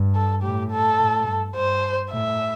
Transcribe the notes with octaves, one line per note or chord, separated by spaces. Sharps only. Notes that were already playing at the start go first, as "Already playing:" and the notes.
Already playing: G2
A4
A2 G4
A4
A2
G2
G2 C5
A2 E5